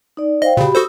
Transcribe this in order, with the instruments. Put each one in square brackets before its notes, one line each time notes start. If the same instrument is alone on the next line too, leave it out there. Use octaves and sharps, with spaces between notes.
[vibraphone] D#4 D5
[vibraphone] C5 F5 G5 [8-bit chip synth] D#5
[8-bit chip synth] A#2 C#3 [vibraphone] F#4 G4 B5
[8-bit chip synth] F#4 A4 C5 [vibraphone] D#6 E6